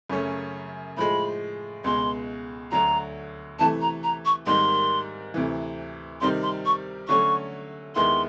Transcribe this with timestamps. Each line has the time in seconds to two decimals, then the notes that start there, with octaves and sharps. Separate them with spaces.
0.09 F#2 C#3 F#3 A3 C#4
0.97 A2 F3 G#3 B5
1.84 C#2 B2 G#3 C6
2.72 D2 D3 F#3 A#5
3.59 C3 E3 A3 A5
3.81 A#5
4.03 A#5
4.25 C#6
4.47 G#2 D#3 G3 A#3 D#4 C6
5.34 D2 C3 E3
6.21 C3 D#3 G3 C4 D#4 C6
6.43 C6
6.66 C#6
7.08 D3 F#3 A3 C#4 C#6
7.96 D#2 D#3 G#3 B3 E4 C6